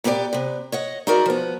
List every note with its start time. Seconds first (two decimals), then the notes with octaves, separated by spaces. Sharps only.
0.04 A#2 B3 G4 A4 D5
0.33 C3 B3
0.72 C#5 D#5 F#5
1.07 D#4 E4 F#4 G#4 A#4 D5
1.26 F3 B3